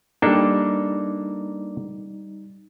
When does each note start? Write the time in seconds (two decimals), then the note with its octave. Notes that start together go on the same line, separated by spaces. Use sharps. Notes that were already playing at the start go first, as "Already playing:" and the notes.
0.22 G3 A#3 D4 D#4 A4